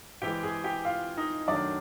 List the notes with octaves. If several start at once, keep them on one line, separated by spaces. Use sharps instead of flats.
C3 E3 G#3 G4 G5
G#4 G#5
G4 G5
F4 F5
D#4 D#5
F#2 D#3 F#3 A3 D4 D5